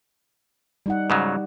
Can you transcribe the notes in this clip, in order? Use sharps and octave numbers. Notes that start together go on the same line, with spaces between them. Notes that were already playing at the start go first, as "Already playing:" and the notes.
G3 D#4 F#5
G#2 C#3 F#3